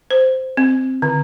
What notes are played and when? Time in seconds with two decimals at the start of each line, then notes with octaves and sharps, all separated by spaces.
0.11 C5
0.57 C4
1.02 D3